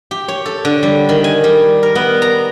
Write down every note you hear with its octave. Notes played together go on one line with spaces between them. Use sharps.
G4
C#5
A4
D3
G3
D#3
G#5
G3
A#4
B3
A#5